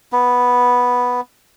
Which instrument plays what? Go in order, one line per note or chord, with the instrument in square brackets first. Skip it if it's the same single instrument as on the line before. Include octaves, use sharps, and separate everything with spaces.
[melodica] B3